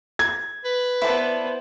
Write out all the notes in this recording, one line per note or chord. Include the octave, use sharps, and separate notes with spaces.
G#6
B4
B3 E4 C5 D5 A5